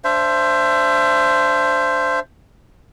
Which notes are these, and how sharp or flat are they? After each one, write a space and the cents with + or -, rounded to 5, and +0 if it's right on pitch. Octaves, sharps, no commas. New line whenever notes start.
D4 -10 C5 +0 E5 +30